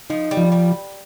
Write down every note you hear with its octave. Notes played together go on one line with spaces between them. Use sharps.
F3 D#4
G3
F3
G3